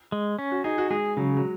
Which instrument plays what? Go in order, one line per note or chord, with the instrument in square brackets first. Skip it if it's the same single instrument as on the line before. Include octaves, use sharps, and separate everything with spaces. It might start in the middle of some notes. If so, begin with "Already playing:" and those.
[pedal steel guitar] G#3
C#4
[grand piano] F#4
[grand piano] D#4 [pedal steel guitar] G#4
[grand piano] F#4
[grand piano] G#3 [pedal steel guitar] G#4
[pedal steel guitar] C#3 [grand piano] F#3
[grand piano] F#3